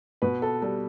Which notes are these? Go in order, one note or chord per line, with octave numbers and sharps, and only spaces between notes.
B2 B4
A4
G3 A4